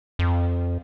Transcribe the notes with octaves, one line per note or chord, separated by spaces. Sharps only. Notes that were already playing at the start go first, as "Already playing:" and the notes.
F2